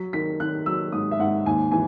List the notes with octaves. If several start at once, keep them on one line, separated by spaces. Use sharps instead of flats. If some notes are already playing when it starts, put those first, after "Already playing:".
Already playing: F#3 B6
D#3 B6
D#3 F#6
F#3 E6
G#2 D#6
E5
G#2 F#5
D#2 G#5
E3 G#5